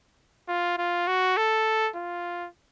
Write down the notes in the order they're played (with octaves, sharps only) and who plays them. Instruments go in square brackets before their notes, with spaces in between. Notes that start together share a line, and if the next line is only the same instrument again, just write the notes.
[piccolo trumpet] F4
F4
F#4
A4
F4